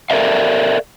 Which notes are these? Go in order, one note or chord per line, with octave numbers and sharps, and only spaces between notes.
A4 A#4 C5 D5 E5 F5